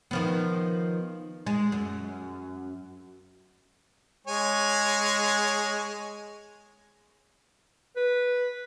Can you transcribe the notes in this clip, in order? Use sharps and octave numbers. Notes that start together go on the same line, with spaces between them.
D#3 F3 B3
G#3
F#2
G#3 C#5 G#5
B4